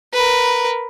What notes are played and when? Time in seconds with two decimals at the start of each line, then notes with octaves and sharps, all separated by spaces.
0.14 A#4 B4